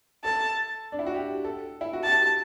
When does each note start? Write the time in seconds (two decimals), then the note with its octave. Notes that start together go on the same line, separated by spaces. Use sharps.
0.24 A4 A5
0.92 D4
0.99 E4
1.06 F#4
1.14 G4
1.44 A4
1.81 E4
1.93 F#4
2.04 G4 A5